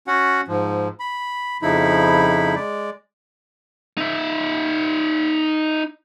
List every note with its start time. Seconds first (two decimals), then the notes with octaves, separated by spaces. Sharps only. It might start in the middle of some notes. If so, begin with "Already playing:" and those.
0.07 C#4 F#4 F#5
0.48 G#2 F3
1.00 B5
1.62 F2 C#3 F3 D#4 E4 B5
2.56 G#3 D5
3.98 D#4 E5